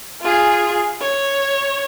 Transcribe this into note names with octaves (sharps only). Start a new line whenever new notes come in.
F4 G#4
C#5